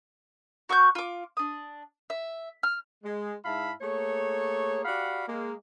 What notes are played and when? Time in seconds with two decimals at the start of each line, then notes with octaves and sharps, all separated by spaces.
0.69 F#4 C#6 D#6 G6
0.95 F4 D6
1.37 D4 D#6
2.10 E5
2.63 F6
3.04 G#3
3.45 G#2 E4 E5 F5 A5 B5
3.81 A3 A#3 G#4 C#5
4.85 F#4 G4 D5 F5 F#5 B5
5.28 G#3 A#3